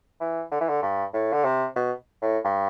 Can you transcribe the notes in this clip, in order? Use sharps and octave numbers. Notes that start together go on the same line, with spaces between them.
E3
D3
E3
D3
G2
A2
D3
C3
B2
A2
G2